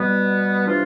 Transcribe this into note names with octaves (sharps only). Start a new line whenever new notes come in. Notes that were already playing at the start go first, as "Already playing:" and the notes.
Already playing: B2 G3 B3
C3 E3 G3 D4 F4